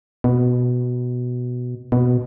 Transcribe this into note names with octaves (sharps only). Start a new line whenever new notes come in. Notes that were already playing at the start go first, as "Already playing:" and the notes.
B2
B2